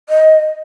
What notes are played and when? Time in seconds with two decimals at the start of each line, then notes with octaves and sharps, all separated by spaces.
0.09 D#5